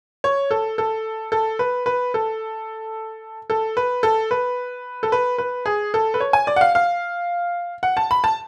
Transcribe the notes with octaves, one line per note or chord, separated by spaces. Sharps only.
C#5
A4
A4
A4
B4
B4
A4
A4
B4
A4
B4
A4
B4
B4
G#4
A4
B4
C#5
G#5
D5
F#5
F5
F5
F#5
A5
B5
A5